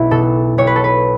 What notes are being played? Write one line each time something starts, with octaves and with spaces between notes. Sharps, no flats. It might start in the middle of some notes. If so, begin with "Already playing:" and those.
Already playing: B1 E4
B2 A4
B1 C#5
B4
A4
B4